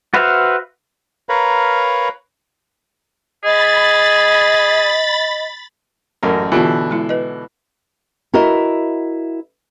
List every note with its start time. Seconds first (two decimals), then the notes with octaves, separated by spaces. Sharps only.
0.14 F#4 B4 C5 E5 F5
1.29 A#4 B4 C#5 F5 A#5 B5
3.44 G#4 D#5 B5 A6
6.23 A1 F#2 A#4
6.52 B2 D3 E3 F4 G4
6.91 G#3 E4
7.09 B4 D#5
8.34 E4 F#4 A#4 D#5 E5